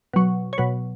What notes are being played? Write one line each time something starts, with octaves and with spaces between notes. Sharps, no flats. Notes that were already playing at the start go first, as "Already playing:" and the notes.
B2 F#3
C#5
B2 F#3 B4